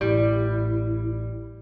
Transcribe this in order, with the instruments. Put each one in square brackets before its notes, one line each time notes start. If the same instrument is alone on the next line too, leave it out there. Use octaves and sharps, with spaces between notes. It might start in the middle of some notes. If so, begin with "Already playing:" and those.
[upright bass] A1 [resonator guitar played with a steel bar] G3 [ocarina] E4